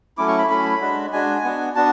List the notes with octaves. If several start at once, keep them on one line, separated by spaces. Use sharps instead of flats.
F#3 A3 C#4 E4 D6
C#6
B5
F#3 A3 C#4 E4 B5
G#3 D4 F#4
G#3 D4 F#4 G#5
B3 D4 F#4
B3 D4 F#4 A5